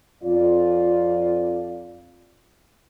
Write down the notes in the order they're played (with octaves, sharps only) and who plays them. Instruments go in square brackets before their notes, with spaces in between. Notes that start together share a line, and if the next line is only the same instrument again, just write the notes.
[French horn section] F2 F4 D5